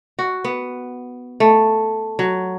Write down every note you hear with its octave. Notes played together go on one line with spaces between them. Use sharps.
F#4
B3
A3
F#3